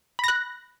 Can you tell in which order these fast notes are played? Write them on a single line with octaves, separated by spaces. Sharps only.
B5 A#6 F#6